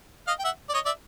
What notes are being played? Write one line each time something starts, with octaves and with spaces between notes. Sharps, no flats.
D#5 F5
G5
E5 F#5
D5
C#5 D#5
D5 E5